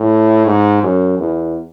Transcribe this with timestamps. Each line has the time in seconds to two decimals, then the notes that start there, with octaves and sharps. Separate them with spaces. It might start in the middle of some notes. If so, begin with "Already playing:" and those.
Already playing: A2
0.46 G#2
0.83 F#2
1.19 E2